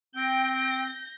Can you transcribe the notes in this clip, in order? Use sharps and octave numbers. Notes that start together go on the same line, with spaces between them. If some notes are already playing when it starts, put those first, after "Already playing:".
C4 G5 G6 A#6